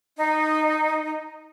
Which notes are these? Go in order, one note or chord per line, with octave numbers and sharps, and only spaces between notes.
D#4